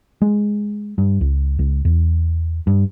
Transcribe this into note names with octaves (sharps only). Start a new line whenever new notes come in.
G#3
G2
C#2
C#2
E2
G2